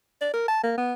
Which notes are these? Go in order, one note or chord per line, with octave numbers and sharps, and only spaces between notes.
D5
A#4
A5
A#3
B3